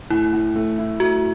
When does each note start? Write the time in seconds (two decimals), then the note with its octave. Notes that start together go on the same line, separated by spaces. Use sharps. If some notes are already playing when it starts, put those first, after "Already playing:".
0.10 A2 E4
0.33 A2
0.56 A3
0.78 E4
1.00 A3 F#4